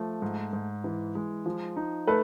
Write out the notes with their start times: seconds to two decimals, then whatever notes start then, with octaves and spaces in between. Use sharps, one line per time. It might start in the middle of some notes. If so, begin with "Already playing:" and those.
Already playing: F3 A3
0.22 G#2
0.53 G#2
0.84 E3
1.15 G#3
1.46 F3
1.76 D#4
2.07 A3 A4 B4